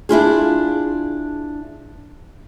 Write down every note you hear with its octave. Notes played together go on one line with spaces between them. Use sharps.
D4 E4 F4 G#4